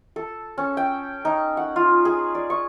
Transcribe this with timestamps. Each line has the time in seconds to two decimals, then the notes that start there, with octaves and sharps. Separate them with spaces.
0.16 A4
0.58 C#4
0.77 G5
1.25 D#4
1.57 F#5
1.76 F4
2.05 G#4
2.35 D5
2.50 C#6